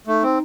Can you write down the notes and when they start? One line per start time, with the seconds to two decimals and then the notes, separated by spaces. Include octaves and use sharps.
0.07 A3 D#4
0.23 C4